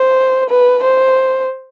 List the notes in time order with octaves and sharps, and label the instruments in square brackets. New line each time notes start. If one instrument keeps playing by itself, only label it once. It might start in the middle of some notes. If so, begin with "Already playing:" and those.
Already playing: [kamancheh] C5
B4
C5